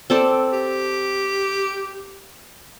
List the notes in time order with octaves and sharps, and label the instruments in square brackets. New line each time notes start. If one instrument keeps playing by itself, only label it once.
[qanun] C4 A4 D5
[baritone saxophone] G4